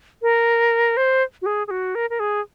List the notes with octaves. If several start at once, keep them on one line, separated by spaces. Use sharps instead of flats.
A#4
C5
F#4
G#4
G#4
F#4
A#4
A#4
G#4